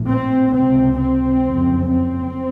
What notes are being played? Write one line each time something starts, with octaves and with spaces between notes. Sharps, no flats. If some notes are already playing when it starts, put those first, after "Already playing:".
Already playing: A#1 A2
C4
C#2 C3 C4
C4
F#1 F2 C#3
C4